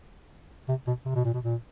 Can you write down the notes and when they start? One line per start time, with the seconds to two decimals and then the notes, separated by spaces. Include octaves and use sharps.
0.68 C3
0.87 B2
1.05 C3
1.15 B2
1.25 A#2
1.34 B2
1.44 A#2